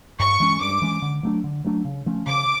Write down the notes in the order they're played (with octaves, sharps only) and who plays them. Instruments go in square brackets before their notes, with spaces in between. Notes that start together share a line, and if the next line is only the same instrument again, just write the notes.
[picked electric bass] G2 [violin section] C#6
[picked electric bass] E3 G#3 C#4
[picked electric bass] G2 [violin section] D6
[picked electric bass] E3 G#3 C#4
D3
F#3 A3 D4
D3
F#3 A3 D4
C#3
F3 A3 C#4
[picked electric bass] C#3 [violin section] D6